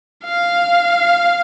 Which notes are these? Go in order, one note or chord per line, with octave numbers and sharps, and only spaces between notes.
F5